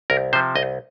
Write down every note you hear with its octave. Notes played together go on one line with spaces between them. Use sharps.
C2 A#4
C3 F3 C5
C2 D#5